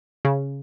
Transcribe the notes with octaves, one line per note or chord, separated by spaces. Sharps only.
C#3